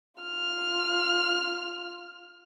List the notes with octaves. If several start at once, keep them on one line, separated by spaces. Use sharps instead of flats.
F4 F6